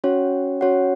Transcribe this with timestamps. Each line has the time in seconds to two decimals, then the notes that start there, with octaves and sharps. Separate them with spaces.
0.04 C#4 F#4 C#5 F#5
0.61 C#4 F#4 C#5 F#5